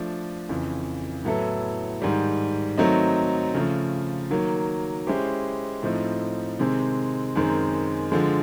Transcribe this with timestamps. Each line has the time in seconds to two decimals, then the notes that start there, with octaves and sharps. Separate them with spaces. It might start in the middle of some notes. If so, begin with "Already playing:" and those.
Already playing: F3 A3 D4
0.49 F2 C#3 E3
1.25 A2 F#3 B3 E4 A4
2.02 G#2 D#3 G3
2.78 D#3 F#3 A3 C4 D#4
3.54 C#3 F3 A3
4.30 D#3 F#3 A#3
5.07 G#3 C#4 E4 G4 C5
5.83 A2 F3 A3 C4 D#4
6.59 C3 D#3 G#3 C4
7.35 F#2 D#3 G#3 C4
8.12 D3 F3 G#3